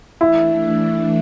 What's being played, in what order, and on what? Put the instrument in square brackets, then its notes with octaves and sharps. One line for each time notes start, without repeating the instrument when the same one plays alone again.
[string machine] E3 A3 D4 [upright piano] E4